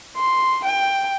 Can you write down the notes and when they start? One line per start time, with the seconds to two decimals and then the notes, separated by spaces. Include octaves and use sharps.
0.16 C6
0.65 G5